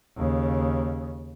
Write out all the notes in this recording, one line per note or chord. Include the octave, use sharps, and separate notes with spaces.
D#2 C#3